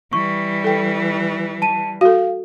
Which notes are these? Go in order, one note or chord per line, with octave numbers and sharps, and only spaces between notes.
E3 G3 C#6
A4 G5
A5 D#7
F#4 A4 F5